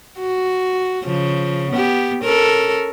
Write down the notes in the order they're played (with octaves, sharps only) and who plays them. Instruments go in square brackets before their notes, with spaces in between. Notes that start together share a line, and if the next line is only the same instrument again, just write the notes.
[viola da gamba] F#4
C#3 F3
B3 G4
C#4 A4 A#4